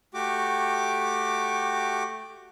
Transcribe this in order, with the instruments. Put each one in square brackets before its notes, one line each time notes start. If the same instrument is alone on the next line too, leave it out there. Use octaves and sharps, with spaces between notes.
[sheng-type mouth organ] A3 F#4 G4 D6